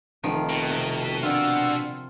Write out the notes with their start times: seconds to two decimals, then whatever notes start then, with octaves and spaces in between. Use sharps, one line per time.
0.24 F1 D#3 F3
0.50 B2
0.70 C3 A#4
1.00 E5
1.23 G2 F4 D5 F#5 E6